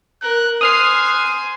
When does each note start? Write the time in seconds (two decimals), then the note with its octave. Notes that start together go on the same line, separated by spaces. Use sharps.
0.22 A#4 F#6
0.61 C5 G#5 D#6 F6 F#6 C7